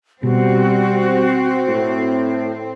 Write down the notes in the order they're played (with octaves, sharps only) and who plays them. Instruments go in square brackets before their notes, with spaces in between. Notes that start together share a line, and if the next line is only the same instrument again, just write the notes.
[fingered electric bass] B2 [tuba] G3 [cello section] C4 [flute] F#4
[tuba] A2